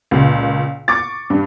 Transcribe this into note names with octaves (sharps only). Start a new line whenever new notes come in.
C#2 A#2
C#6 D6 A6
G2